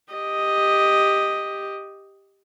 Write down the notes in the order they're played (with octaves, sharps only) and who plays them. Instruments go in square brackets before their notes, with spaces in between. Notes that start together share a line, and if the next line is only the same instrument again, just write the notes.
[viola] G4 D#5